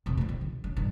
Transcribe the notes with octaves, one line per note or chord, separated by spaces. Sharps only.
F2 C3
G2 G3
D#3
C3
C#4
G2 D#3